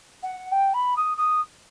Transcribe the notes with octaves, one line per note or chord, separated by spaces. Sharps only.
F#5
G5
B5
D#6
D#6